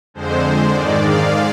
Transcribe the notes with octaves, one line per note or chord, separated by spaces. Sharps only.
F2 D3 G#3 C5
G#2 D#3 G#3 D5
F5